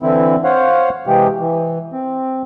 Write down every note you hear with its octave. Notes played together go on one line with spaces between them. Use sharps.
D3 E3 C4 E4
C5 C#5 F5 F#5
C3 E3 G#3 G4
E3
C4